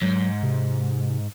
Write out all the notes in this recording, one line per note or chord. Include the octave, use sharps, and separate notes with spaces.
G#2 F#3
C3